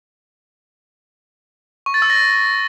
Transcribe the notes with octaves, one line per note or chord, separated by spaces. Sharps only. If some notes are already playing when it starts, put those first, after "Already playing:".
C#6
A6
E6
A#6